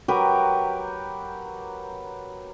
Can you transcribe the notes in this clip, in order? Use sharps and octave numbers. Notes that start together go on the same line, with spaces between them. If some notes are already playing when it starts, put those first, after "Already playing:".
F#3 G4 A#4 B4